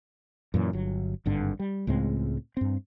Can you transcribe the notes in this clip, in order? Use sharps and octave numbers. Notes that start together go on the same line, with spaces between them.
F#2 A#2 E3
G1 F#3
G#1 G2 D3
G3
C#2 A2 G#3 C4
G2 C4